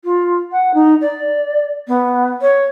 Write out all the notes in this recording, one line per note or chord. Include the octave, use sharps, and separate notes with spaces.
F4
F#5
D#4
D5
B3
C#5